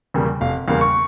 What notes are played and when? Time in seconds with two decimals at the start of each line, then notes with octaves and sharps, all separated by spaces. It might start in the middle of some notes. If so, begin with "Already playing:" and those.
0.14 E2 C#3 G3 A#3
0.41 F1 F5
0.68 E2 C#3 G3 A#3 F5
0.81 C#6